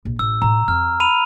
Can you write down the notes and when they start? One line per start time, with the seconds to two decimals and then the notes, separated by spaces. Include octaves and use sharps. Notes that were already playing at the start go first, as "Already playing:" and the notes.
0.05 A#1
0.19 A1 E6
0.42 A2 F4 A#5
0.68 F2 F6
1.00 B5 D#7 F7